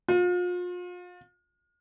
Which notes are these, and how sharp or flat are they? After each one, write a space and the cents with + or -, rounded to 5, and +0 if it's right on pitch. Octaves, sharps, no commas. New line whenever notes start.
F4 +35